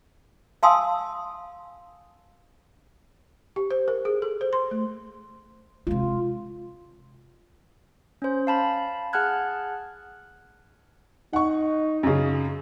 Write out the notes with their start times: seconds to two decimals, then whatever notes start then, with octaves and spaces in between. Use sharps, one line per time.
0.63 F5 G#5 A5 C6 D#6 E6
3.56 G4
3.71 C5
3.88 A#4
4.05 G#4
4.22 A4
4.41 C5
4.53 C6
4.71 A3
5.87 C3 G#3 F4
8.22 C#4 C5
8.47 F5 A5 B5
9.13 G#4 F#5 A5 F6 F#6 G#6
11.33 D#4 F#5 C#6
12.03 F#2 C#3